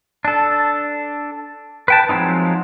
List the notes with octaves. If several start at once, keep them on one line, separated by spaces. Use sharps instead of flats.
D4 A4
B4 G5 A5
F3 F#3 G#3 C4 D#4